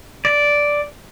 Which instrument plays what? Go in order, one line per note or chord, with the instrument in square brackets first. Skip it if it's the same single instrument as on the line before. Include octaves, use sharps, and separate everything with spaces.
[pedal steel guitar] D5